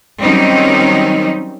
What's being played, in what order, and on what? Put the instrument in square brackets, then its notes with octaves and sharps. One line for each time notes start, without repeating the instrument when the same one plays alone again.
[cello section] D#3 F#3 G3 C4 C#4 D#4